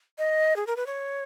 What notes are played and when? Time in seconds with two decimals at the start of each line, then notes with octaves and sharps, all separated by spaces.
0.18 D#5
0.56 G#4
0.67 A#4
0.76 B4
0.86 C#5